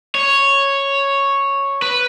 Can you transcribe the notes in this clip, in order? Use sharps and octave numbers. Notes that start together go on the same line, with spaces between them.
C#5
B4